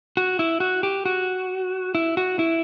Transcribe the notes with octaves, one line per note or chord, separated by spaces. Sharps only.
F#4
E4
F#4
G4
F#4
E4
F#4
E4